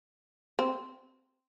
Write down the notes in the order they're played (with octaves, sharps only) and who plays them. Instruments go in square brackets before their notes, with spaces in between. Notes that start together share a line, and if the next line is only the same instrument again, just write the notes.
[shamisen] C4